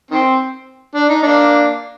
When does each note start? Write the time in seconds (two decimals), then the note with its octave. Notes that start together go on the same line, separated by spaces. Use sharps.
0.11 D#3 C4
0.95 D4
1.09 D#4
1.23 A#3 D4